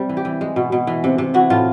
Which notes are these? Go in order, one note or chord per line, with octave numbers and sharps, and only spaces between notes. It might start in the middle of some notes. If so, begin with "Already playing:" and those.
Already playing: C3 G3
E3
G4
E3
G#3
B2
B2
E3
C3
C3
E3 F#4
A2 F4